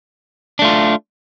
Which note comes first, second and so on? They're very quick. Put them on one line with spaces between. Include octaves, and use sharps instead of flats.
D4 A3 F4